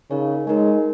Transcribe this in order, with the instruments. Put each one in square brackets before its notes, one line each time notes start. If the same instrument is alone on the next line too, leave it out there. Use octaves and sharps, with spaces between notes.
[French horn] C#3 [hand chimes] D#4 A#4 C#5 G#5
[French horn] G#3 [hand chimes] D#4 A#4 C#5 G#5